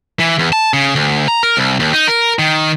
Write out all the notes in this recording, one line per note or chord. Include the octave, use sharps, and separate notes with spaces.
E3
E2
A5
C#3
D2
A#5
A#4
C2
D#2
D#4
A#4
D#3